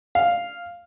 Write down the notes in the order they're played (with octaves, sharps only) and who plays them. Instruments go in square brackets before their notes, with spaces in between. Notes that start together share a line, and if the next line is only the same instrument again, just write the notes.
[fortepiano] F5